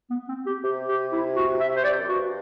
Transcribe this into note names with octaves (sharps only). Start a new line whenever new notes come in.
B3
C4
G4
C3 G4
G4
E4
F#4
E5
C5
D5
F#2
G2 F#4